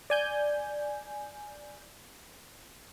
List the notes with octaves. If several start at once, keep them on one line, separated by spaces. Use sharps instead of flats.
D5 G#5 G6